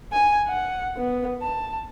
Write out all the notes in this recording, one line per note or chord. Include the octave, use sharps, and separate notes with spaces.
G#5
F#5
B3
A5